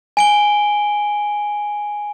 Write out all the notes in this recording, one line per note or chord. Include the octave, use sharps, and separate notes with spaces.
G#5 D7 G7